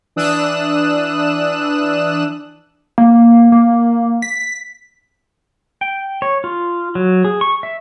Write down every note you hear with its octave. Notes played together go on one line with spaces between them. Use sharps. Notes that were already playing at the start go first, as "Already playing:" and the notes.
E3 D4 D#6 E6 F#6 E7
A#3
A#3
B6
G5
C#5
F4
F#3
G#4
C#6
E5